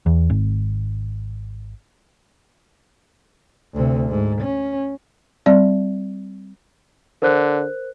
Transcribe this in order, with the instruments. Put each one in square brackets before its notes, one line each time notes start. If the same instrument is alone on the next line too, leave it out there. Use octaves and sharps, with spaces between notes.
[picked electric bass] E2
G#1
[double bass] D2 C3
G#2
C#4
[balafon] G3 C4 D5
[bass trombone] D3 [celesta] A#4 C5 F#6